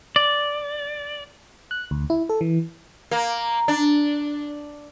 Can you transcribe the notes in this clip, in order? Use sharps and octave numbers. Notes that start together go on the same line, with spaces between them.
D5
F#6
D2
E4
A4
E3
A#3
D4